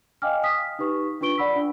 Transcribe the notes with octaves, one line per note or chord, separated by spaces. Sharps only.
D#5 F5 G5 G#5 D6 F6
D#6 B6
D#4 G4 B4 C#6
D4 F4 B4 C#6 D7 G7
D5 F#5 B5 E6 B6
D4